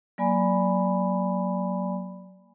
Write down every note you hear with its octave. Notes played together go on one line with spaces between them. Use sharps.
F#3 A#3 D5 G#5 B5